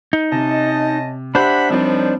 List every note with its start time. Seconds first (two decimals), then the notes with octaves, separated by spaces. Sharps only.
0.13 D#4
0.32 C3 C#4 D#5 A5
1.35 D4 G4 C5 E5 F#5 B5
1.70 F#2 F3 G3 C4 D#4 D5